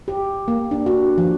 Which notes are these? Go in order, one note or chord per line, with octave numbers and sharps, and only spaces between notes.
G4
A#3
D4
F#4
F3